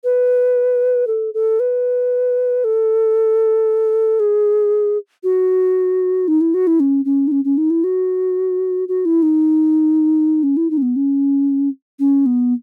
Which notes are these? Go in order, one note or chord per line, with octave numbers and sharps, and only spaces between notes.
B4
A4
A4
B4
A4
G#4
F#4
D#4
E4
F#4
E4
C#4
C#4
D#4
C#4
C#4
D#4
E4
F#4
F#4
E4
D#4
C#4
E4
D#4
C#4
B3
C#4
C#4
B3